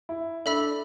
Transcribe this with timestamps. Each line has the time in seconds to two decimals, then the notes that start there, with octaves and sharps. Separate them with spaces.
0.09 E4
0.46 D4 A4 E5 B5 E6